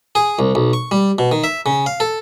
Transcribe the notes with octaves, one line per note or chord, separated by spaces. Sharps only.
G#4
C2
B1
C#6
G3
B2
D#3
E5
C#3
F5
A4